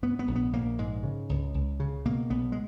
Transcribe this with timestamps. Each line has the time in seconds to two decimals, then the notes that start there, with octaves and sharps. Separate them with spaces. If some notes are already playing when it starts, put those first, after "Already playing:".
0.02 G#2 B3
0.19 B3
0.28 A#1
0.36 B3
0.53 A#1 A#3
0.78 G#2 G#3
1.03 C#3
1.29 C#2
1.54 C#2
1.80 C#3
2.05 B2 A#3
2.30 B1 B3
2.52 G#3